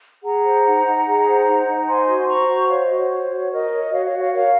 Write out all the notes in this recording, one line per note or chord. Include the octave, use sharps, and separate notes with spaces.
G#4 F#5 A#5
C5
D#4
D#4
G#4
C5
D#4
D#4
C5 G#5 C6
F#4
C5 A#5 C#6
F#4
C5 C#5 F5
D#5
F#4
C#5
C5
F#4
A#4 D#5
C#5
F#4 C#5 F5
C#5 F5
F#4
C#5 F5
A#4 C#5 F5